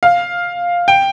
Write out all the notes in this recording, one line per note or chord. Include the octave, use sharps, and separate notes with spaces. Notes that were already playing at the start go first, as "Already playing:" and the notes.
F5
G5